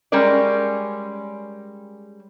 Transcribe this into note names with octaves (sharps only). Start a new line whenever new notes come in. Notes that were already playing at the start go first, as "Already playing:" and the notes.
G3 G#3 C#4 A#4 D5